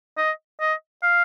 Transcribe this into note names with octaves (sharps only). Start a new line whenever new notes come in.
D#5
D#5
F5